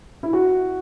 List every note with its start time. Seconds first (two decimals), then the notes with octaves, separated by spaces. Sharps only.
0.23 E4
0.33 F#4